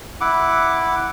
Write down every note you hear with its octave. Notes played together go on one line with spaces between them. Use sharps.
E4 F#5 D6